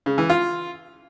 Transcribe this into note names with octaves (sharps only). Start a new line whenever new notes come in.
C#3
E3
F4